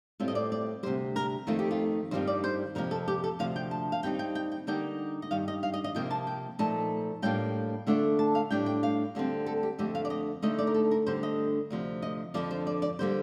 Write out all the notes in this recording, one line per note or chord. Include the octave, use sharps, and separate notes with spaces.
A2 G3 C4 F4
D#5
D5
D5
D2 C3 G3 C5
A#4
F2 D#3 A3 C4 F4
G4
F4
G2 D#3 G3 C4 F4 C5
D5
C5
F2 C3 F3 A#3 A#4
A4
G4
A4
D2 C3 F3 F5
G5
A5
F5
D#2 D#3 G3 C4 D#4 G5
G5
G5
G5
D3 G3 A#3 D#4 G5
D#5
G2 D#3 G3 F5
D#5
F5
D#5
D#5
C3 F3 A#3 F4 G5
A5
G5
A#2 F3 A3 D#4 A5
A2 G3 A#3 D4 F4 G5
D3 A3 D4 F4
A5
F5
A2 G3 D4 G5
G5
F5
D2 D3 G3 C4
A4
G4
F2 D3 A3 C4 G4
F5
D5
D#5
D3 A3 D#4 D#5
D5
A#4
A4
A#4
D2 D3 G3 C5
D#5
D2 C3 F3
D#5
F2 D3 F3 D5
C5
D5
D5
D3 G3 A#3 C5